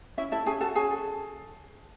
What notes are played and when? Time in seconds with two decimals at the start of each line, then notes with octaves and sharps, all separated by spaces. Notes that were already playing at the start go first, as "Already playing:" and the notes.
0.17 C#4 E4 E5
0.32 E4 A4 E5
0.46 C#4 G#4 G#5
0.60 F#4 A4 A5
0.75 C#4 G#4 G#5
0.90 A4